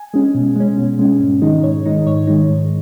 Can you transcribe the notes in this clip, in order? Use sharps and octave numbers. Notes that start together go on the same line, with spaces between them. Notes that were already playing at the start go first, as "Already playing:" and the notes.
Already playing: G#5
G#3 C#4
B2
G#3 C#4
B2
G#3 C#4
G#2
D#3 G#3 D#4
G#2 C#5
D#3 G#3 D#4
G#2 C#5
D#3 G#3 D#4
G#2